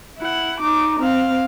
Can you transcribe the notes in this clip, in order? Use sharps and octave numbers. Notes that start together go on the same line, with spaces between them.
E4 F#5
D#4 D6
C4 F5